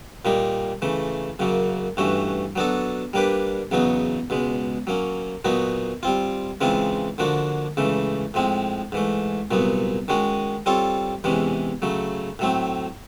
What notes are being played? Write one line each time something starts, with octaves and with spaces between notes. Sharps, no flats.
A#2 G3 A#3 D#4
C#3 E3 A3
F#2 C#3 F#3 A#3
G2 E3 A3 C#4 F#4
F#3 B3 D4 F#4 A4
G3 A#3 D4 G4 B4
E2 C#3 F#3 B3 D#4
C#2 B2 G#3
F#3 A#3 C#4
A#2 F#3 B3 D#4 F#4
G3 C4 F4
C#3 E3 G#3 C4 F4
D3 F3 A#3 D4 F#4
C#2 C#3 E3 A3
A2 F3 G#3 C4
G#2 E3 A3
C2 A#2 F#3 B3
D#3 G#3 C#4 F#4
G3 C4 F4 A4 C#5
E2 C3 E3 G#3 C#4
C#3 F#3 A3
A2 F#3 A3 C4